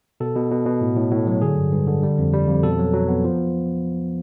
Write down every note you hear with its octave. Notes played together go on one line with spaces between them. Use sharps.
B2 A4
B2
B2
B2
A2
A2
A2
F#3
D3 G#4
G2
G2
D3
G3
F2
G3
F2
B2 A4
F#3
F#3
B3
F3